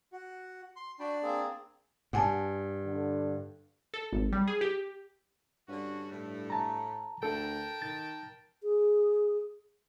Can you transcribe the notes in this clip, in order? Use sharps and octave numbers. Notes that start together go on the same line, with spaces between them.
F#4
C6
D4 F#4 G5 B5
A#3 C4 G#4
G2 F#5 G#5 A5
D3
A4
G#1
G3
G#4
G4
G2 D3 C#4 F#4
A2 A3
A5 A#5
D2 A4 A#4 G5 A5
D#3 A6
G#4